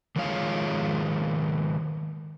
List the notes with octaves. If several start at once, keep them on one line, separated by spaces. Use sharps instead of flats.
D#3 F3 G#3 C#5 F5